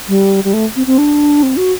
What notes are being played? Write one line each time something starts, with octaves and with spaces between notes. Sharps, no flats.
G3
G3
A3
C4
C4
D4
C4
F#4